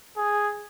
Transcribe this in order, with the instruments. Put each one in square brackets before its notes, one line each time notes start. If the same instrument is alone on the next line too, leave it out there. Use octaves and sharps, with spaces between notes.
[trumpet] G#4